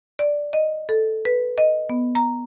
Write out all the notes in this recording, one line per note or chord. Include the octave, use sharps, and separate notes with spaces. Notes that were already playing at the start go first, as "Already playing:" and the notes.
D5
D#5
A4
B4
D#5
B3
A#5